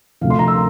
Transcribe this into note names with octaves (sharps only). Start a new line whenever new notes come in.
D2 C3 F3 F5
C6
A#5
E6